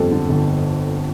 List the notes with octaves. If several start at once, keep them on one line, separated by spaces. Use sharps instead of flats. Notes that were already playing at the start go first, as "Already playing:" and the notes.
Already playing: G1 F2 D3 G3 A4
D3
G1